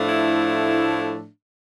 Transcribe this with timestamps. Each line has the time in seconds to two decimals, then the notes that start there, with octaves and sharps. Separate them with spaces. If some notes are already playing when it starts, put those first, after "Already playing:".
Already playing: A2 F3 A3 D4
0.09 E4